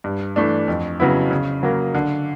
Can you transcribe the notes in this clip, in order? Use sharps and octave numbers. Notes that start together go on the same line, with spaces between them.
G2
E3 A3 D4
F2
C#3 F#3 B3 E4
C#3
F#3 A#3
D3